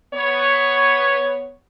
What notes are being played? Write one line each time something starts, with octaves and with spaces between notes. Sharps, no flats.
B3 C#5